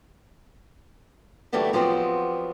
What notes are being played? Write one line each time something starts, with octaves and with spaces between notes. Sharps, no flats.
D3 E3 F#3 G3 A3 D#4
F3 F#3 G#3 B3 C4 G4